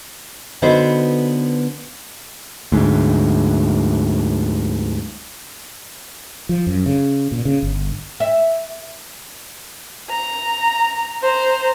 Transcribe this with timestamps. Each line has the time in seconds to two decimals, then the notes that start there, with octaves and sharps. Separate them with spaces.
0.62 D3 B3 D#4 F#4 B4 C5
2.72 D2 G#2
6.49 F3
6.67 F#2
6.86 C#3
7.32 A#2
7.45 C#3
7.62 G1
8.20 E5
10.10 A#5
11.22 C5 A#5